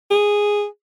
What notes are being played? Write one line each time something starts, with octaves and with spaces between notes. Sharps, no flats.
G#4